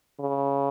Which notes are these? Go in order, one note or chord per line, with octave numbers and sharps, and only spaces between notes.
C#3